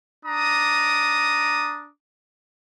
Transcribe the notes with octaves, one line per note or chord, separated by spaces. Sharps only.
D4 A#5 D6 D#6